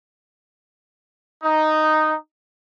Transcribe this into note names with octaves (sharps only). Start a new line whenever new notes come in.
D#4